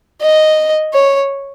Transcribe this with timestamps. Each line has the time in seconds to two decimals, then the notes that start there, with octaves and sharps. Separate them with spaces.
0.22 D#5
0.93 C#5